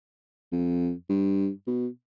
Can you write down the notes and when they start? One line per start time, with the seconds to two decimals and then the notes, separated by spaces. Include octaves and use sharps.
0.52 F2
1.09 G2
1.67 B2